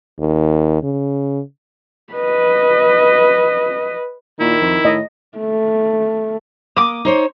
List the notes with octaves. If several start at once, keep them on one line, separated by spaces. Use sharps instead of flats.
D#2
C#3
B4 D#5
A#2 D#3 E4
F2
A2 D#5
A3
A#3 D6 D#6
D#4 C5 C#5